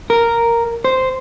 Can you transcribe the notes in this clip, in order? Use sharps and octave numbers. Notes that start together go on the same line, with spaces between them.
A#4
C5